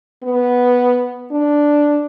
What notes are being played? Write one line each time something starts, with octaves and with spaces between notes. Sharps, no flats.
B3
D4